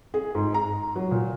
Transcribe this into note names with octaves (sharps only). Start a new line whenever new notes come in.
G#4
G#2
A#5
F#3
A#2